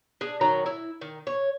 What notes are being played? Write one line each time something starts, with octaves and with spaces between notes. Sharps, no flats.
D4 G#4
D#3 F#3 A#5
E4
D#3
C#5